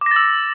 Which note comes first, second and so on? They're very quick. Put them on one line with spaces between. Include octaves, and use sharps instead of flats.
D6 A#6 A6 E6